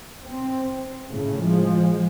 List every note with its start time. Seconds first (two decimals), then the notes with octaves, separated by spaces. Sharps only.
0.25 C4
1.10 A2 C#3 A3
1.41 F3 G#3